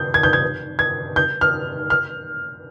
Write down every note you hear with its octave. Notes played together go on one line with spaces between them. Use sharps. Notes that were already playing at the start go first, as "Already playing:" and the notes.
Already playing: G6
G#6
G6
G#6
G#6
G6
F6
F6